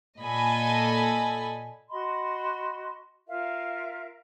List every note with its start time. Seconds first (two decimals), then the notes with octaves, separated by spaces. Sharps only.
0.22 A#2 A4 D#5 G#5 B5
1.90 F#4 D#5 B5 C6
3.27 F4 A#4 E5 F5